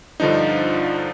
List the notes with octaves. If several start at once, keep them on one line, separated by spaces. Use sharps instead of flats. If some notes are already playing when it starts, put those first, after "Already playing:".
G2 D3 F3 D4 D#4